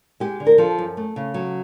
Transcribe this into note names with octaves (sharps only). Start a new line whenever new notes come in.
G#3 G4
D3
A#4
F3 A4
F#2
A3
C#3
F#3